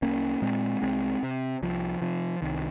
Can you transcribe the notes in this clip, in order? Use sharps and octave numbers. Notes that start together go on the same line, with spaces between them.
C2 A#3 C#4
A#2 G#3 C4
C2 G#3 C4
C3
C2 F3
C3 F3
C2 D#3